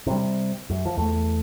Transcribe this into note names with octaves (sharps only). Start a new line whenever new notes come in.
C3 G3
F#2
F3
E2 A3